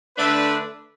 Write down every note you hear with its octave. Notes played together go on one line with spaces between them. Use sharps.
D3 A3 D4 B4